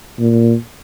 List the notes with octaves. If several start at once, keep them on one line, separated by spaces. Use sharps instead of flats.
A#2